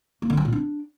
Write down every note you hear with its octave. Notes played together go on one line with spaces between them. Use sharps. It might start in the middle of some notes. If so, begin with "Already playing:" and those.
A#3
D3
F#3
A#2
D4